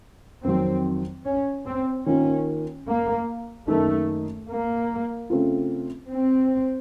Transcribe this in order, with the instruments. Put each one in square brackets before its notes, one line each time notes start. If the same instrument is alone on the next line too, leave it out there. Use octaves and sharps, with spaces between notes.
[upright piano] F2 D#3 F#3 [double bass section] C4
[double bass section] C#4
C4
[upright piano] D#3 A#3 F4 [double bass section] C#4
[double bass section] A#3
[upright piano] F#2 D#3 A#3 D#4 [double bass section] A3
[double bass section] A#3
[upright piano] C#3 A3 C4 F4
[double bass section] C4